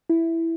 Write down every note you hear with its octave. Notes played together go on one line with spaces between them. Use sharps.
E4